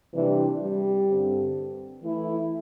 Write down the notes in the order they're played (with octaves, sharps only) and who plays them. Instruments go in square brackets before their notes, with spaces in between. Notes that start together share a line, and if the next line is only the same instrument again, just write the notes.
[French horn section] C3 G3 D4 G4 [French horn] E3
[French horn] G3
[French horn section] G2 D3 C4
E3 A3 E4